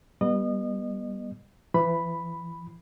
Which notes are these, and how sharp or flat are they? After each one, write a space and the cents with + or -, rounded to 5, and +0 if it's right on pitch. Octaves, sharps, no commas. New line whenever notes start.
G3 +0 B3 -25 D#5 -30
E3 +25 B5 +0